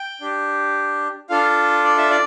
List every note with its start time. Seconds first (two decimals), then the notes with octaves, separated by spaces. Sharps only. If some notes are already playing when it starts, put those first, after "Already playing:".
Already playing: G5
0.21 D4 G4
1.29 D4 F4 A4 F5
1.84 D5
1.98 E5
2.10 D5